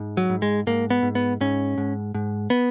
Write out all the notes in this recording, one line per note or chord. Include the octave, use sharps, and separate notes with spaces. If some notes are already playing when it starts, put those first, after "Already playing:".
Already playing: G#2
F#3
G#2
G#3
G#2 A#3
B3
G#2
B3
G#2 C#4
G#2
G#2
B3